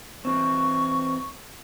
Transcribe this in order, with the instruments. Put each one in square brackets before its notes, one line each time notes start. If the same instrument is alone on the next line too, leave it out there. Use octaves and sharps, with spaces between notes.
[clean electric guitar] E3 C4 [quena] C#6